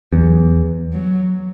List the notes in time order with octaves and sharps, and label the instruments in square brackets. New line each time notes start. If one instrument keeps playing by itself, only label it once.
[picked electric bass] E2 [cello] F#3
[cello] F#3